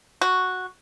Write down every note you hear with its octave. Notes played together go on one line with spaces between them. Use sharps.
F#4